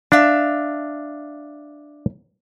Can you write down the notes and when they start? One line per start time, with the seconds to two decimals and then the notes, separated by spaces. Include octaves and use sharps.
0.12 D4 E5 F5 A5